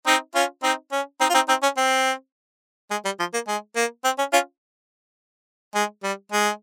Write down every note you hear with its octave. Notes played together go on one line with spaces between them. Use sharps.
C4 D#4
C#4 F4
C4 D#4
C#4
C4 D#4
F4
C4 D#4
C4 D#4
C#4
C4
G#3
G3
F3
A#3
G#3
A#3
C4
C#4
C#4 F4
G#3
G3
G#3